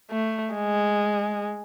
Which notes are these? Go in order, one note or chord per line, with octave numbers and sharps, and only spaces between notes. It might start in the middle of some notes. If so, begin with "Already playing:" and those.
A3
G#3